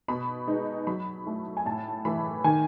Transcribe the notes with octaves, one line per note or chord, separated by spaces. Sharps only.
B2 B5
G#3 B3 D#4
F#3 B5
A3 E4
G#5
A2 A5
E3 A3 E4 B5
D#3 G#5